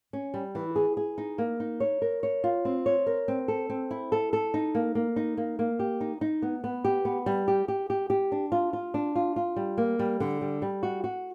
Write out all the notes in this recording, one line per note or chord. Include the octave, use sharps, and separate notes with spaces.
C#4
G3
E3
G#4
G#4
D#4
A#3
D#4
C#5
A#4
C#5
F4
C4
C#5
A#4
C4
A4
C4
E4
A4
A4
D#4
A#3
A#3
D#4
A#3
A#3
G4
D#4
D#4
B3
B3
G4
B3
G3
G4
G4
G4
G4
D4
F4
F4
D4
F4
F4
G3
A#3
G3
D3
G3
G3
F#4
F#4